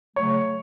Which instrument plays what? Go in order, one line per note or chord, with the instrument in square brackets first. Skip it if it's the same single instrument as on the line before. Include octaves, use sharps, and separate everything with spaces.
[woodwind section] C#3 F#3 A3 [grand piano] C#5